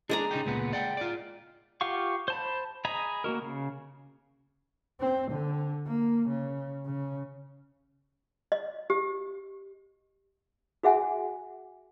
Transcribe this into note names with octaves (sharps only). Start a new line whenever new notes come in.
G#3 D4 D5 G#5 A#5
C#3 D#4 G4
C#2 A#2 B3
D5 F#5 G5
F4 D5
F4 G4 F5 F#5 C#6
C5 A5 B5
G#4 D#5 A#5 B5
A#3 C4 F#4 A#4
C#3
C4
D3
A#3
C#3
C#3
D#5
G4
F#4 G#4 E5 F#5 G#5